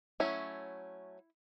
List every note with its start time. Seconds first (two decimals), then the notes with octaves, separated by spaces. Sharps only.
0.20 F#3 A3 C#4 E4